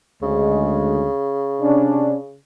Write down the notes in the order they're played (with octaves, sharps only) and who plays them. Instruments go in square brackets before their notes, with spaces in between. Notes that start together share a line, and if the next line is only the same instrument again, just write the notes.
[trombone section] D2 G#3 [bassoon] C#3
[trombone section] C3 C#4 D4